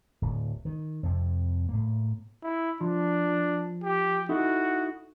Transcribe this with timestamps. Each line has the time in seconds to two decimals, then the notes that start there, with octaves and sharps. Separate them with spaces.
0.22 D1
0.65 D#3
1.03 F2 C3
1.69 A2 A#3
2.43 E4
2.81 F3 D4
3.83 G4
4.29 D#4 E4 F#4 A4